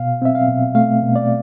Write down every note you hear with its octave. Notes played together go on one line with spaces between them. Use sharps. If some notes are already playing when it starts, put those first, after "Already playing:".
Already playing: B2 F5
C4 E5
F5
B2
A3 F5
B2
D5